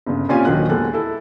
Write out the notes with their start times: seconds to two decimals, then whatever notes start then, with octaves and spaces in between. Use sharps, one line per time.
0.07 G1 C#3
0.29 A#1 C4 C#4 F4 G4 G#5
0.45 D#1 D3 D#3 F#3 G4 F#6
0.69 E2 G#3 A#3 A4 F#6
0.93 E4 A4